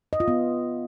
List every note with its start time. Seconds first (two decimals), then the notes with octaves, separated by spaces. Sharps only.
0.13 D#5
0.20 F4
0.28 B3